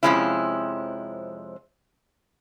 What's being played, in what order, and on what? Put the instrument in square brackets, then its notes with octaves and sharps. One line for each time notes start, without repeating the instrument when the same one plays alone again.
[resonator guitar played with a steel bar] F2 C3 F3 G#3 C#4 E4